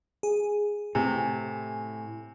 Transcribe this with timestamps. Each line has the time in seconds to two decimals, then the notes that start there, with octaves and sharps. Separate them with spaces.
0.23 G#4
0.95 A2 C3 G#5